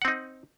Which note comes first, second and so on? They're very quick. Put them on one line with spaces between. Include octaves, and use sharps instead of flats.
F#5 C4 D#4